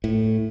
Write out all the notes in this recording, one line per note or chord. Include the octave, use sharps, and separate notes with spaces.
A2